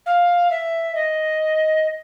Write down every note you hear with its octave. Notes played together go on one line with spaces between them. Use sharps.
F5
E5
D#5